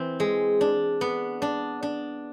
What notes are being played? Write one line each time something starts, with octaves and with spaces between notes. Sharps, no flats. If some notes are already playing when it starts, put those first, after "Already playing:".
Already playing: E3 C4
G#3
D4
B3
D4
D4